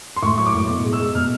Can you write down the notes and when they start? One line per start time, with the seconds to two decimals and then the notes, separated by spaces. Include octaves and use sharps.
0.16 C6
0.23 A2 C#6
0.38 F#3 C#6
0.46 D6
0.54 A2
0.69 B2
0.84 G#3
0.93 E6
0.99 G#3
1.15 B2 F6